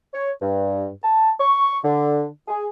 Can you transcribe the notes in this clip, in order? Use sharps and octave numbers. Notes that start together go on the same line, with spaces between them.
C#5
G2
A5
C#6
D3
G#4